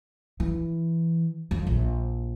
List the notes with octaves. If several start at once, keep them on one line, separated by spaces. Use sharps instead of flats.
E3
F2
A#1